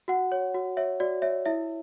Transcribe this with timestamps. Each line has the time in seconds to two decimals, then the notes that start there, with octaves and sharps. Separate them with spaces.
0.08 F#4 F#5
0.32 C#5
0.54 F#4
0.77 C#5 E5
1.00 F#4 D5
1.22 C#5 E5
1.45 E4 E5